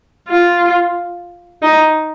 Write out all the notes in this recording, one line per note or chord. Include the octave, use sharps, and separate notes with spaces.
F4
D#4